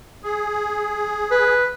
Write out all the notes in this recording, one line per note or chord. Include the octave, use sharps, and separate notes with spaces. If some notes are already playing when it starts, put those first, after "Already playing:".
G#4
B4